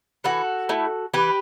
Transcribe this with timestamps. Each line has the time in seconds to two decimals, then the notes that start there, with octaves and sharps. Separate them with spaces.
0.24 E3 F#4 A4
0.69 A3 E4
1.14 E3 G4 B4